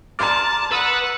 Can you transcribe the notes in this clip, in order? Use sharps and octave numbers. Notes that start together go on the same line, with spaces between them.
D5 A5 A#5 C6 F6
B4 F#5 D#6 E6